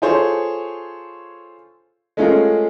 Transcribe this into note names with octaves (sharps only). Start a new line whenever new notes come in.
F4 G#4 A4 C5 C#5
G#3 A3 C#4 F4 G#4 A#4